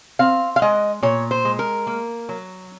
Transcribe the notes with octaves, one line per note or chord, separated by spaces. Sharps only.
C4 F5
F5
G#3 D#5
A#2 C#5
C5
G#3
A#4
A#3
F#3